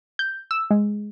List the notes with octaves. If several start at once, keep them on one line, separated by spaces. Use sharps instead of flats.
G6
E6
G#3